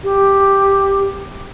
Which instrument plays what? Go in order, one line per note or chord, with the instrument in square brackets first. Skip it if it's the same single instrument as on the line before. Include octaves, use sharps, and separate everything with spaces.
[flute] G4